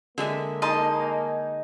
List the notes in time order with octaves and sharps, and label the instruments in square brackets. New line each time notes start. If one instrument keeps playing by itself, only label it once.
[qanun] D3 G#3 E5 [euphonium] A#3
[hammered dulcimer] D#4 G#4 [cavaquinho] D#5 A5 C6